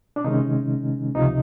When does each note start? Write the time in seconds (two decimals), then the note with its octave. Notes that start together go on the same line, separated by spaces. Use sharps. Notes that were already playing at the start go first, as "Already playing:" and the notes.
0.16 D4
0.24 C3 D#3 G#3 C#4 D#4
1.15 C#2 C3 F3 D#4